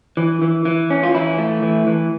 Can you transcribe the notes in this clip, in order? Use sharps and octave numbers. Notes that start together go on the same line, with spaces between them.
E3
E3
E3
C#4
F4
E3 E4
A3
E3
E3